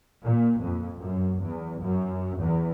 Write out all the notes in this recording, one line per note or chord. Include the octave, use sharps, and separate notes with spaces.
A#2
F2
F#2
E2
F#2
E2